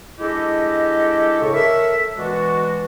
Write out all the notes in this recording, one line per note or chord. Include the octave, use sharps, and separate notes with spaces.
G#3 D4 E4 G4 A4 D#5
A2 C#3 A4 C#6
A4 A#4 C#5 E5
B2 E3 G#3 D4 F#4